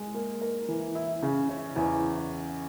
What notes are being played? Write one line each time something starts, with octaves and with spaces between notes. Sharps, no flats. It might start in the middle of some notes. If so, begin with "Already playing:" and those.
Already playing: G#3
A#3
A#4
E3
E4
C#3
C#4
E2